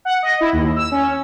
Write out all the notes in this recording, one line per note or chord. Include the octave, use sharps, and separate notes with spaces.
F#5
D#5
E4
D#2
E6
C#4